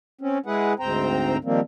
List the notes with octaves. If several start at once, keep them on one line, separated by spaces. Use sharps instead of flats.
C4 C#4
G#3 E4 G#4 B4 F#5
D2 G#2 C4 C5 G5 A#5
D#3 F3 G3 A#3 C4